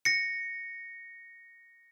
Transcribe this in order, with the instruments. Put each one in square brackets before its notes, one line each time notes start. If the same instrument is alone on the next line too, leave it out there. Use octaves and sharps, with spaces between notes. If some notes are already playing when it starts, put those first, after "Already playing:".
[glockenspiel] A#6 C#7